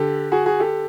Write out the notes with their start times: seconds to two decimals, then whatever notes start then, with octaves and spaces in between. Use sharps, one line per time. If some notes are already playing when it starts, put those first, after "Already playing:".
Already playing: D3 G4 A4
0.32 F#4 G#4
0.46 F#4 G#4
0.60 G4 A4